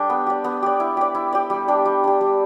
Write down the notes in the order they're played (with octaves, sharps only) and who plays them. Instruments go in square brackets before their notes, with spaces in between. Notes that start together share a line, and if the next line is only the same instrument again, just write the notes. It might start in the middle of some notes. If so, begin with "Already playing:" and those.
Already playing: [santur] G3 D4 G4 A4
B3
G4 D5
B3
G4 D5
E4
G4 D5
E4
G4 D5
G3
D4 G4
G3
D4 G4
G3